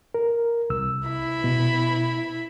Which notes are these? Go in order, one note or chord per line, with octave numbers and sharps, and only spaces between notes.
A#4
C2 E6
E4 B5
B2